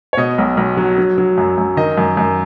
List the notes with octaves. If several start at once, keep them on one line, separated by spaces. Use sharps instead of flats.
C#5
B2 D#5
B1
B1
F#3
F#3
F#3
F#2
F#2
D#3 D#5
F#2
F#2